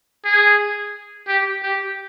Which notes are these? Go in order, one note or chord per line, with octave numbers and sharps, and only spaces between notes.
G#4
G4
G4